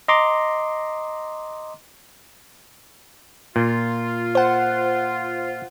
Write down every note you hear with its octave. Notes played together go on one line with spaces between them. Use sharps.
D#5 A#5 C6 D6
A#2 F4
C5 F#5